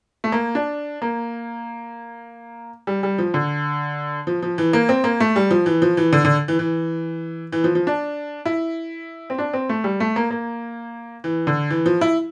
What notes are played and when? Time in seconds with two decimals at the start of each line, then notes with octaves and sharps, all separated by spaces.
0.24 A3
0.32 A#3
0.55 D4
1.02 A#3
2.87 G3
3.03 G3
3.18 F3
3.34 D3
4.27 F3
4.42 F3
4.58 E3
4.73 A#3
4.89 C4
5.04 A#3
5.20 A3
5.36 G3
5.51 F3
5.66 E3
5.82 F3
5.97 E3
6.13 D3
6.25 D3
6.48 E3
6.59 E3
7.52 E3
7.64 F3
7.75 F3
7.87 D4
8.45 E4
9.30 C4
9.38 D4
9.53 C4
9.69 A3
9.84 G3
10.00 A3
10.16 A#3
10.31 A#3
11.24 E3
11.47 D3
11.70 E3
11.86 F3
12.01 E4